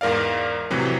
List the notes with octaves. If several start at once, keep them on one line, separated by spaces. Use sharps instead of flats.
E2 G#2 A#4 D5 F5
F2 A2 C3 E3 F#3